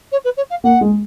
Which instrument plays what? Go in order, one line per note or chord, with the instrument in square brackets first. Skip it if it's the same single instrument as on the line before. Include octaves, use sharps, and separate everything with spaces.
[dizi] C#5
B4
C#5
F5
[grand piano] A#3 [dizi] F#5
[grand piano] G#3